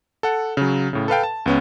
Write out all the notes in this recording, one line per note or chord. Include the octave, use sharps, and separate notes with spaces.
A4 F#5
C#3 F#3
A2 C#3
A4 B4 F5 G5
A5
C#2 B3 C#4